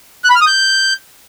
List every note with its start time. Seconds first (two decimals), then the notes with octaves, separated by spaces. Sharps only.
0.24 F#6
0.30 B5
0.35 F6
0.41 D#6
0.47 G6